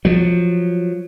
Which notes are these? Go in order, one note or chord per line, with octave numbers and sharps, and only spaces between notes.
F3 F#3